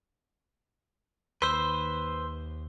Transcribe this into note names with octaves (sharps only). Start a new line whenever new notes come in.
D#2 A#3 B4 C5 C6 E6